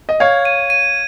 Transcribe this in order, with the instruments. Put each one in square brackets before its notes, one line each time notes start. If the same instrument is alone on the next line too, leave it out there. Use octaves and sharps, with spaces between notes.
[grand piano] D#5
[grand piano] C#5 F5 [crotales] G#6
[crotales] D#7
D#7